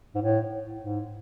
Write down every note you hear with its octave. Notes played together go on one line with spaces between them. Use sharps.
G#2
A2
G#2